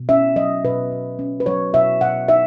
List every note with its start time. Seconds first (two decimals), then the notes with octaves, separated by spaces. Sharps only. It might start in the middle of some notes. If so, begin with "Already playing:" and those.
Already playing: B2
0.09 C#4 E5
0.36 F#3 D#5
0.65 B2 B4
0.92 B2
1.19 C#4
1.40 B4
1.46 F#3 C#5
1.74 B2 E5
2.01 B2 F#5
2.28 D#4 E5